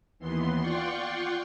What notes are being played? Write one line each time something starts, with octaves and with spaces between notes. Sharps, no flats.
D#2 E3 B3 C6
F4 D5 F#5 G5 C6 C#6